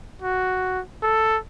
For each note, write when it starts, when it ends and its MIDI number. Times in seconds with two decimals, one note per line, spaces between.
0.22 0.81 66
1.03 1.37 69